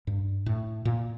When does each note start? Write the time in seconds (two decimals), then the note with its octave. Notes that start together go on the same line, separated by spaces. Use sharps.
0.07 G2
0.46 A2
0.85 A#2